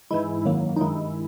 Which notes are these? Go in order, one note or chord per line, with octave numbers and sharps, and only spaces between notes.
G#2 E3 G#3 E4
F#2 D#3 F#3 A#3
D#4
G2 D#3 G#3 E4